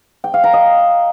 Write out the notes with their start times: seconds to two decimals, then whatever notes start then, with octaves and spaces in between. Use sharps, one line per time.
0.24 G5
0.34 F5
0.44 A#5
0.53 D#5